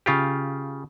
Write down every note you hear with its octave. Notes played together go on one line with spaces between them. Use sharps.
C#3 F4 G4